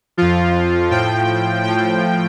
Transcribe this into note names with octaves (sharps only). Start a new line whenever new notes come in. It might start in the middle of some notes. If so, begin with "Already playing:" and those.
F2 F3 F4
A2 F3 G5
A2 F3 G5